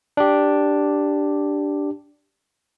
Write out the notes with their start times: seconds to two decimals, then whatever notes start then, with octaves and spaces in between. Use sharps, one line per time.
0.17 D4 G4